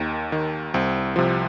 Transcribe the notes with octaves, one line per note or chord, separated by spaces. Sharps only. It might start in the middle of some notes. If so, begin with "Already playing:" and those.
Already playing: D#2 D#3
D#3
C2 C4
C3 F3